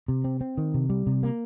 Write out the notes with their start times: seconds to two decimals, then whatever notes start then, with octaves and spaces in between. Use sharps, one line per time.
0.08 C3
0.24 C4
0.41 C4
0.58 D#3
0.74 C3
0.89 G3
1.07 C3
1.23 A#3